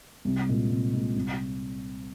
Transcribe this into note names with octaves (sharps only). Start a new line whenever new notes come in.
C2
A#2 G#3
C2
A#2 G#3
C2